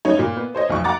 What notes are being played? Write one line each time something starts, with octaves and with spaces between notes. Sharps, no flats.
G2 C#4 D#4 C#5
A#2
B3
C5 C#5 D#5
B1 F2 C#6
F#5 A#5 D6 A6